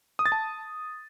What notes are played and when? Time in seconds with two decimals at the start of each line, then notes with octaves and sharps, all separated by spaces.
0.19 D#6
0.26 A6
0.32 A5